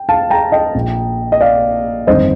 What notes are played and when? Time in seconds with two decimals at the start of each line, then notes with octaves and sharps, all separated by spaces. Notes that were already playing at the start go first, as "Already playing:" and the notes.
Already playing: G5
0.09 F5 A5
0.30 G5 A#5
0.52 D#5 G5
0.75 A#1 A#2
1.32 D#5
1.41 D5 F5
2.07 G1 F2 D#3 C5 D#5